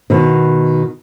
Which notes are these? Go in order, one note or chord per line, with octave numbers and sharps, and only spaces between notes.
B2 D#3